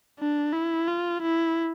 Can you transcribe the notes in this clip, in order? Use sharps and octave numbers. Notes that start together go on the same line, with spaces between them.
D4
E4
F4
E4